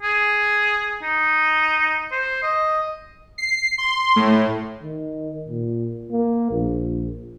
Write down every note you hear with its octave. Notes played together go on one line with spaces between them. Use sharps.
G#4
D#4
C5
D#5
C7
C6
A2
D#3
A#2
A#3
A#1